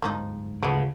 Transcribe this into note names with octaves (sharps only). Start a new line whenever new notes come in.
D1 G1 G#2 D#3 F3 D#4
D2 C#3 F3 B3